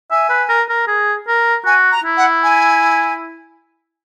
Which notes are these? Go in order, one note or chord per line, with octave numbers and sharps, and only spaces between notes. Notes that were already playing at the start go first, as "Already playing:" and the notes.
E5 G#5
B4
A#4
A#4
G#4
A#4
F#4 G#5
A#5
E4
F#5
G#5